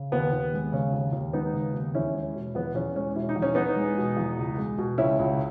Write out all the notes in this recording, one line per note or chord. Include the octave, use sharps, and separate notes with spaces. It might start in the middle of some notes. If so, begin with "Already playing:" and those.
Already playing: C#3
D#2 B3
D#2
G#3
C#3 C#4
D#2
D#2
G#3 B3 D#4
C#3
D#2
E2 C#4 E4
G#3
B2
E2 B3
E2 C#4
G#3 C#4
B2 E4
D#4
E2
C#4
E2 B3 D#4
G#3
B2
E2
C#2
G#3
B2
C#2 C#4 E4
C#2